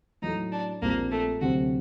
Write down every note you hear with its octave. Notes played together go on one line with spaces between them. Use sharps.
A2 F#3 A3 D#4
D4
A#1 A#2 G3 A#3 C4
A3
D2 C3 F#3 C4 F#4